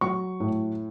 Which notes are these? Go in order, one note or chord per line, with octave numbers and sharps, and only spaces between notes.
F#3 C#6
A2